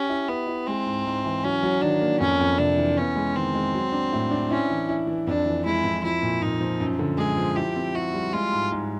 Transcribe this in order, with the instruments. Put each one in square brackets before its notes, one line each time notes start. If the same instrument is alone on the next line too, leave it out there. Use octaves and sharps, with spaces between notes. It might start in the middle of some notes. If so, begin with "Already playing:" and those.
Already playing: [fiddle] C#4 [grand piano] G4
[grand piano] E4
[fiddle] B3 [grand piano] E4
[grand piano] E4
[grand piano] G#3 [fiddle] C4
[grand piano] G#2
G#2
E3
[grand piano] F#3 [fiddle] C#4
[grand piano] F#3
[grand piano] D#3 [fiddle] D4
[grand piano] A#3
[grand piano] F2 [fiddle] C#4
[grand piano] F2
[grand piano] C3 [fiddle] D4
[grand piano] E3
[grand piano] B3 [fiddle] C#4
[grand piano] G#3
[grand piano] D#3 [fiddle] C4
[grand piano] G#3
F#3
D4
A2
D4
[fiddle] C#4 [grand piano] E4
[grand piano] E3
E4
E3
[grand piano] F2 [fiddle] D4
[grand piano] E3
[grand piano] G#3 [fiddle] E4
[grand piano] F2
[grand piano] F3 [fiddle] E4
[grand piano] A#2
[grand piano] A#2 [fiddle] D#4
[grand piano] F3
F#2
D3
[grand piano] G#3 [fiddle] G#4
[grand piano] F3
[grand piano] E4 [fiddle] G4
[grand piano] C4
[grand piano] E4 [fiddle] F#4
[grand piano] G3
[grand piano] G#3 [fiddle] F4
[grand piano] G#2
G#2